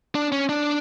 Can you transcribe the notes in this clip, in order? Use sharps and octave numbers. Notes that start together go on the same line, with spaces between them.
D4
C#4
D4